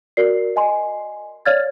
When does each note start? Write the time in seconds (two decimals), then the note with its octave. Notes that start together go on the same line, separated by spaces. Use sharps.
0.17 F#4 A#4 D5 C7
0.56 D#5 G#5 C6
1.46 C#5 D5 F5 F6 G#6 A6